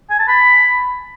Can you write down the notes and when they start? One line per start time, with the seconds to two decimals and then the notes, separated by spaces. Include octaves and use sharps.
0.10 G#5
0.19 A5
0.28 B5